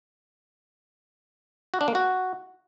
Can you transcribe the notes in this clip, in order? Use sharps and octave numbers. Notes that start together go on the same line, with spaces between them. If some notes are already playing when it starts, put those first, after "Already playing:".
F#4
D4
A#3
F#4